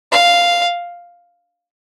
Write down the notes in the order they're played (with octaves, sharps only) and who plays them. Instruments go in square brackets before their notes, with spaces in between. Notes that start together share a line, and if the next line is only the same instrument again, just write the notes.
[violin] F5